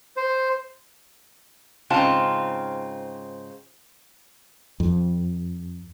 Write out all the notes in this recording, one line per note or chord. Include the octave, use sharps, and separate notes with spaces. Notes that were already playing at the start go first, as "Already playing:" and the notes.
C5
G#2 C#3 C4 F4 A5
F2